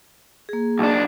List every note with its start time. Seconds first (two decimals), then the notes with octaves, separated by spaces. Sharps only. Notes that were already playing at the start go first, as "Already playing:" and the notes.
0.49 A#3 G#4
0.79 B1 D4